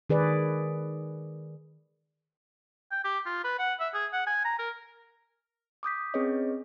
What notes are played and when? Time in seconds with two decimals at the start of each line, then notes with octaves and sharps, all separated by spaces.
0.10 D#3 G#4 B4 D5
2.91 G5
3.04 G4
3.26 F4
3.44 B4
3.59 F#5
3.80 E5
3.94 G#4
4.13 F#5
4.27 G#5
4.45 A#5
4.59 A#4
5.83 D6 D#6 G6 B6
6.14 C4 C#4 G#4 B4 C#5 D#5